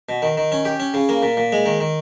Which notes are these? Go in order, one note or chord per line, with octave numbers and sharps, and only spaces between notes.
B2
D#3
D#3
C#4
G4
C#4
C#3
A#3
A#2
A#2
G#3
D#3
D#3